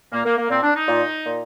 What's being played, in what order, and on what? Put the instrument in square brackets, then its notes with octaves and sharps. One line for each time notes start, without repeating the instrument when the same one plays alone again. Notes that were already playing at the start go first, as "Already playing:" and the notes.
[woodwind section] A#2 A#3
A#3
A#3
A#2 C4
D4
D#4
A#2
A#2